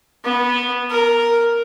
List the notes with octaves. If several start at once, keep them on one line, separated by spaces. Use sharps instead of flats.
B3
A#4